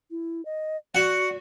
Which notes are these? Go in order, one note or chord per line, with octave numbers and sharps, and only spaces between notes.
E4
D#5
F#4 D5 F#5